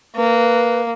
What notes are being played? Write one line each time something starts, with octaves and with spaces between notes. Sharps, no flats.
A#3 B4